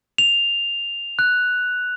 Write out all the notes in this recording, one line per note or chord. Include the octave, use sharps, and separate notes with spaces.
F7
F#6